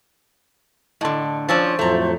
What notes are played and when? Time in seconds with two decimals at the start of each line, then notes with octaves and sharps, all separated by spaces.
1.01 A2 D3 D#5 A5 C6
1.49 F3 C#4 D4 C5 E6 A6
1.79 F2 A2 F#3 A3 A#5